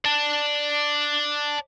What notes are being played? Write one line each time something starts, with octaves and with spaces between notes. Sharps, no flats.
D5 A5